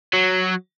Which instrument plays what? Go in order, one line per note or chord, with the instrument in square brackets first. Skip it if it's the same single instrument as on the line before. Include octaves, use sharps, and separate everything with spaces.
[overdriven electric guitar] F#3